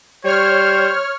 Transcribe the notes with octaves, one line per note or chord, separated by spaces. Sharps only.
G3 C5 C#5 F6